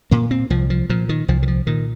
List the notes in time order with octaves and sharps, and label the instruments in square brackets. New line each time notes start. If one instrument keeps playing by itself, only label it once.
[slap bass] A#2 A#3
C4
C2 F3
F3
A#2 F3
D#3
C2 F3
D#3
F3
A#2 D#3